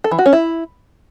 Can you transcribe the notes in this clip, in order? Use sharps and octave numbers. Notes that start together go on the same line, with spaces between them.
A4
E3
F#4
C#4
E4